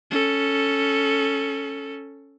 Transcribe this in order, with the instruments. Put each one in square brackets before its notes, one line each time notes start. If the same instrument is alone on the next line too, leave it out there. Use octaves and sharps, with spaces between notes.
[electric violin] C#4 A4